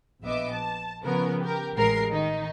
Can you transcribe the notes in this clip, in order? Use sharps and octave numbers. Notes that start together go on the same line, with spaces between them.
A#1 B3 D#5 E5 D6
A5
C#3 F3 B3 C#4 A#4
G4 A#4
A1 G#3 A#4 C7
D#3 D#4